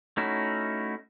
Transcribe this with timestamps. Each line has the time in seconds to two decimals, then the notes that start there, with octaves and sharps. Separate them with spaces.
0.17 A3 C#4 D#4 E4 F#4